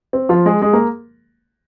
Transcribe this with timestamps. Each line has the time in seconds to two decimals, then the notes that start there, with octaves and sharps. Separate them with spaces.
0.13 C4
0.29 F3 F4
0.46 G#3 G#4
0.62 G#3 G#4
0.73 A#3 A#4